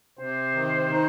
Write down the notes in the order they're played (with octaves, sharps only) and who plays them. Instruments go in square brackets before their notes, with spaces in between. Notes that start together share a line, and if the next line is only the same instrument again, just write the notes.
[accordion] C3 [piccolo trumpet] C5
[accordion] D#3
D#4